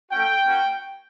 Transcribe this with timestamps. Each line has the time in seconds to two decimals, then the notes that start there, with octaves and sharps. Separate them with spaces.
0.10 A3 C#4 F#4 G5
0.46 A#3 C#4 F#4